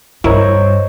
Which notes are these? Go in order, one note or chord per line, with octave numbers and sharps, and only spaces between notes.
G2 E4 A#4 C5 C#5 D#5 C#6